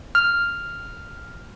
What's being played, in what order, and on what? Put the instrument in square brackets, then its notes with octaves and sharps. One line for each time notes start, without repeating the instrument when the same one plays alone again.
[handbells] F6